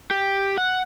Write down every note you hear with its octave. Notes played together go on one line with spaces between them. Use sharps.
G4
F#5